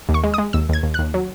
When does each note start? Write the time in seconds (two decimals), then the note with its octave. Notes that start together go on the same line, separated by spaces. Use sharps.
0.09 D#2
0.14 C#6
0.24 G#3
0.34 D#6
0.38 G#3
0.53 D#2 E6
0.69 D#2 G#6
0.83 D#2
0.94 D#2 F#6
1.14 F#3